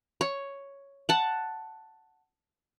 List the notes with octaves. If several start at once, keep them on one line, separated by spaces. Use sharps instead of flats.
C#5
F#5 A5